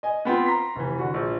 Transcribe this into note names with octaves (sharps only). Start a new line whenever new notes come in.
D#5 G#5
B3 C4 F4
A#5 C6 B6
F1 E3
D3 F#4
A#1